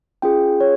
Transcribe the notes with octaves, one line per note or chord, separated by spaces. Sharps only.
C#4 F4 G#4 G5
C#5